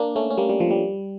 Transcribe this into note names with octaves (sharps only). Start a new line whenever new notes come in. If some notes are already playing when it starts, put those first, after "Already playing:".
Already playing: A#3 D4
A3 C#4
C#4
G3 A#3
G3
F3
G3